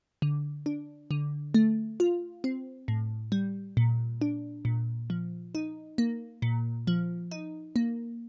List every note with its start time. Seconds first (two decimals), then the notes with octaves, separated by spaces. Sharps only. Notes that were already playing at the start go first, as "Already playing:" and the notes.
0.22 D3
0.66 D4
1.11 D3
1.54 A3
2.00 F4
2.44 C4
2.88 A2
3.32 G3
3.77 A#2
4.22 D4
4.65 A#2
5.10 F3
5.55 D#4
5.98 A#3
6.42 A#2
6.87 F3
7.31 D#4
7.76 A#3